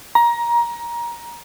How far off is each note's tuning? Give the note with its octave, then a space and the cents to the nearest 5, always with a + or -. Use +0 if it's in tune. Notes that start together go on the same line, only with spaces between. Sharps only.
A#5 +20